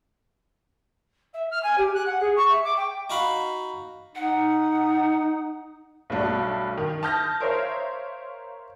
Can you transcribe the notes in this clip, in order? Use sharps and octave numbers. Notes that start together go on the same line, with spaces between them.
E5
F6
G#5
G4
F#6
F#5
G#4
C#6
E5
D6
G5
D#4 F#4 F5 B5
D#4 F#5
B1 G2 A3 D4 F#4
D#3
A5 D#6 F6 G6 G#6 A#6
A#4 C5 C#5 E5 F5